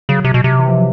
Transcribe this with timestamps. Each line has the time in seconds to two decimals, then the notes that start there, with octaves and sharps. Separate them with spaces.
0.09 C#3 F#3
0.24 C3
0.34 B2
0.44 C3
0.59 E3
0.68 F3
0.77 F#3